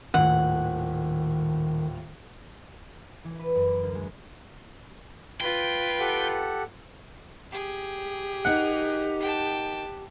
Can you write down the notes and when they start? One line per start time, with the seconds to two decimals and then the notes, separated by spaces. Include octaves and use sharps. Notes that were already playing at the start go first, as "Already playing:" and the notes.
0.14 D#1 A2 D#3 F#5
3.24 E3
3.39 B4
3.55 F#2
3.68 A#3
3.82 D2
3.95 G#3
5.41 F4 B4 G5
6.00 G4 A4 F#5
7.52 G4 G#4 G5
8.45 D#4 A#4 F#5
9.20 G5 A5